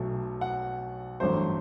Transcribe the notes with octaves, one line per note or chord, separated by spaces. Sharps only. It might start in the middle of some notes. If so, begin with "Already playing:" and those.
Already playing: B1 B2 F#3 A3
F#5
A1 G2 F#3 A3 C5